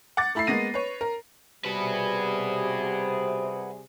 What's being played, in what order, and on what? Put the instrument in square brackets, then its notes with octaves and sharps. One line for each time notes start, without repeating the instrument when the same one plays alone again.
[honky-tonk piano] F#5 D6 A6
A3 E4 B5 E6 C7
G#3 A#3 B3 A#6 D#7
B4 C#5
A#4
[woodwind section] C3 [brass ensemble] G3 G#4 [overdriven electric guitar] F#4 B4